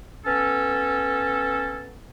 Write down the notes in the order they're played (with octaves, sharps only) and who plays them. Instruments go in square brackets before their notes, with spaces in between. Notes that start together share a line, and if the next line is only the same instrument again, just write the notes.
[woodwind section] B3 C#4 A4